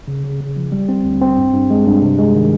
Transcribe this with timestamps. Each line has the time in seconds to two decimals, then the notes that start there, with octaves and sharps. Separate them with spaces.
0.08 C#3
0.24 C#3
0.41 C#3
0.56 F3
0.72 G3
0.89 C4
1.05 D2
1.21 C4
1.37 G2
1.53 G2
1.70 G#3
1.86 G2
2.02 C3
2.19 G#3
2.35 D#3